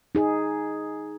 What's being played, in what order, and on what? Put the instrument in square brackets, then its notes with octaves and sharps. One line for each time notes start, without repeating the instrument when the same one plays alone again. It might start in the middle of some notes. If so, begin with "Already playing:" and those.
[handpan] D#4 G#4